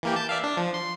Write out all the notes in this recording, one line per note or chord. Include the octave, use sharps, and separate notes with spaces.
E3 A#3 G4
A5 G6
D5 E5 F5
D4
F3
C6